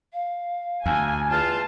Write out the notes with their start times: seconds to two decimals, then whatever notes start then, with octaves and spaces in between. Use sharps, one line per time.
0.13 F5
0.86 D2 G#5
1.29 E2 F4 A5